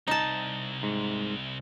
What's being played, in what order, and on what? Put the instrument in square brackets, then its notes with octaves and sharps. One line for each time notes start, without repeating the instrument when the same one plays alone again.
[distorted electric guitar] C2 [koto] D#4 A5
[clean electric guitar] G#2